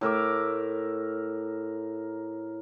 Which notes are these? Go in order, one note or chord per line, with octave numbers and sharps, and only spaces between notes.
A2 A#4 E5 D6